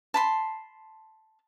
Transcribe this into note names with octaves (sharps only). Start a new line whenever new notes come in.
A5 B5 C6